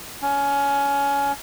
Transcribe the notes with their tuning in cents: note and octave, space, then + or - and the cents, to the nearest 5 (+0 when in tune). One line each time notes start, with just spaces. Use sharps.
C#4 +20